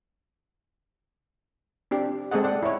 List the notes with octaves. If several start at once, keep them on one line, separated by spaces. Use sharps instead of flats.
C4 D4 G4
G#3 C4 G#4 A4 D#5 F#5
D5 F#5
E4 C#5